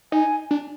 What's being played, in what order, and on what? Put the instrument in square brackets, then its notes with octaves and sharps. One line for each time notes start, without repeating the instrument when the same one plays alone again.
[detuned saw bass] D#4 [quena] G#5
[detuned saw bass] D4